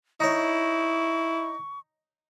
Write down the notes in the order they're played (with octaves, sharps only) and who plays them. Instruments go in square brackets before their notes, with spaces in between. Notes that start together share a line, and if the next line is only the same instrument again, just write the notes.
[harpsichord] D#4 C#5 [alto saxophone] E4 [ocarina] C#6